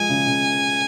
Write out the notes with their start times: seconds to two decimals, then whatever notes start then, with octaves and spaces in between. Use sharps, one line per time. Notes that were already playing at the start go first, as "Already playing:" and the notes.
Already playing: F3 G#3 G#5
0.09 C#3
0.27 C#3